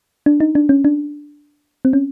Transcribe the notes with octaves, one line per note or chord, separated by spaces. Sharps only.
D4
D#4
D4
C#4
D4
C4
C#4